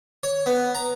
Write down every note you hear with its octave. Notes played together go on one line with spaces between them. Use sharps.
C#5
B3
A#5